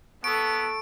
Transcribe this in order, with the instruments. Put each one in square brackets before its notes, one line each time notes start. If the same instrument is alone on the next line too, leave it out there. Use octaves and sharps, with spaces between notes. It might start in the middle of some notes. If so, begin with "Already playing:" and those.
[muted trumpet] B3 [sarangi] A4 [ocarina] C#6 [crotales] D7